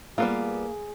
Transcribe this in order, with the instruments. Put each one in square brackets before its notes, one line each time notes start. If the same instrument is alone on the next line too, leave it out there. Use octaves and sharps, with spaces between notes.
[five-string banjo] G3 B3 F4 [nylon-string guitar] A#3 [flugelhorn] G#4